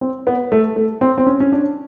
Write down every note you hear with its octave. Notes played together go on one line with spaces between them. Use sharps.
C4
B3
A3
A3
C4
C4
C#4
C#4
D4